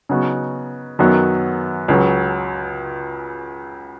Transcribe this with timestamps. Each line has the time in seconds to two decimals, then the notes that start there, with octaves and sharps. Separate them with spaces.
0.09 C#3 F#3 B3 D#4 F#4
0.99 F#2 D#3 F#3 B3
1.88 C#2 C#3 F#3